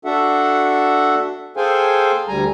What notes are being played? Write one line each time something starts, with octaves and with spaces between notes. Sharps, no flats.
D4 F#4 A4 E5 F#5
G#4 A4 C5 F5 G5 G#5
D2 G3 G#5 A#5